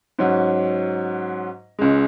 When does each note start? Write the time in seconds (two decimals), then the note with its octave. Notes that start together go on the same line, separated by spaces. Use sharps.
0.19 G#2 F#3 C#4
1.79 C#2 C#3 G#3